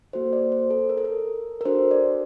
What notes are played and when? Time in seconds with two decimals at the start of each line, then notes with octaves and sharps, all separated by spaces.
0.13 A#3 F#4 A4 C5
0.33 D5
0.52 C5
0.70 A4
0.89 A#4
0.97 A4
1.05 A#4
1.61 A#4
1.65 D4 F#4 A4 C5
1.91 D5